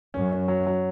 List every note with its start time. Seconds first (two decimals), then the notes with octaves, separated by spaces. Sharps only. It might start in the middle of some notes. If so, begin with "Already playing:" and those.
0.14 F#2 C#4
0.32 C#4
0.48 F#3
0.67 F#3